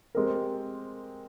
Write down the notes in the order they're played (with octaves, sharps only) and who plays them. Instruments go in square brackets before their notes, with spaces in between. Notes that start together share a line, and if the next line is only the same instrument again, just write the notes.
[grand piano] G#3 C4 G4 A#4